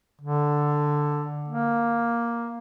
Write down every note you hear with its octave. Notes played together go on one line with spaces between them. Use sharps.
D3
A#3